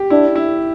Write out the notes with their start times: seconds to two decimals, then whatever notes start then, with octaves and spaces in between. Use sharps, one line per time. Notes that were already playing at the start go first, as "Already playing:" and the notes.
Already playing: G4
0.10 D4 E4
0.36 E4